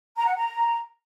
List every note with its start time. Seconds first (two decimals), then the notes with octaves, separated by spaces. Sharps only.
0.16 A#5
0.26 F#5
0.37 A#5